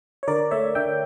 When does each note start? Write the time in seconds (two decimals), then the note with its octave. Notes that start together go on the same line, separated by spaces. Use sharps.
0.23 C#5
0.28 D3 A#4 D5
0.51 A3 C#5 E5
0.75 D3 E5 G5